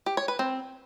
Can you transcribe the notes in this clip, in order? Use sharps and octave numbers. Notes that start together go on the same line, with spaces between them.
G4
C#5
B4
C4